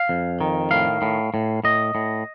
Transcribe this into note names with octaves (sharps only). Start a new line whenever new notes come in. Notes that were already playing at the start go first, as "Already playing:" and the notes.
Already playing: F5
F2
D#3
A2 F5
A2
A2
A2 D#5
A2